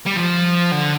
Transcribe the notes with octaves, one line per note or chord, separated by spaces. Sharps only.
G3
F3
D3